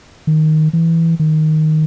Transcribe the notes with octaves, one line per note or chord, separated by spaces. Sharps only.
D#3
E3
D#3